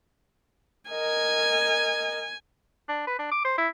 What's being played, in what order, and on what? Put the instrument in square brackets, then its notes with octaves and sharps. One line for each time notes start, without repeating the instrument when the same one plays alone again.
[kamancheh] A#4 D#5 [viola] G#5
[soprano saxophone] D4
B4
D4
D6
C5
E4